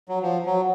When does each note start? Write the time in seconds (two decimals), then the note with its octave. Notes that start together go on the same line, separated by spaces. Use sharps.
0.09 F#3
0.23 F3
0.46 F#3